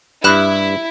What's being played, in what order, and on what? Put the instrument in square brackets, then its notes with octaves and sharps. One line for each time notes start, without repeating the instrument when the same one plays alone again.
[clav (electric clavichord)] G2 [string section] E4 [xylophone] B5 F#6 E7